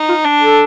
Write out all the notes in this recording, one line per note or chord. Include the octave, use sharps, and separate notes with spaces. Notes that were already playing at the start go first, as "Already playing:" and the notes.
Already playing: D#4
F4
D4
A4